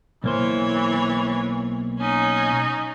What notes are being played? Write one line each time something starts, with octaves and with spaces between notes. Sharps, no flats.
B1 E3 A#3 C5 C#5
C#4 D#4